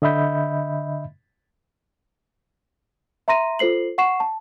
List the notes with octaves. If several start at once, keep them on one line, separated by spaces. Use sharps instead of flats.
D3 D#5 E5 B5 G6
E5 A#5 C6 A#6 D#7
F4 A4 C5 C7 F#7
F#5 C#6 C7 E7
A5